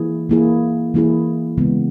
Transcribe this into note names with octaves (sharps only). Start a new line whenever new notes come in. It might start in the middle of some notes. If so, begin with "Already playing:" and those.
Already playing: E3 A#3 E4 G#4
E3 A#3 E4 G#4
E3 A#3 E4 G#4
C#3 E3 G#3 B3